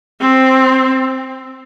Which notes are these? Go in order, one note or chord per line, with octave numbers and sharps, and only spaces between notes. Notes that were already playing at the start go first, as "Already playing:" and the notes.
C4